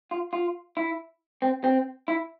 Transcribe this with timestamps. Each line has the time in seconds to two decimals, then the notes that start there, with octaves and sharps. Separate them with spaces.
0.11 F4
0.33 F4
0.77 E4
1.42 C4
1.64 C4
2.08 E4